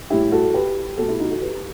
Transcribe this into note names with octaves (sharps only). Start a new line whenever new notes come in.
A2 G3 E4 G4
F#4 A4
G4 B4
B2 A3 F#4 A4
E4 G4
D#4 F#4
F#4 A4
G4 B4